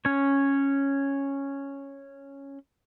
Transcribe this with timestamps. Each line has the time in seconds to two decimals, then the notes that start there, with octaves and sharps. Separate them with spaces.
0.05 C#4 C#5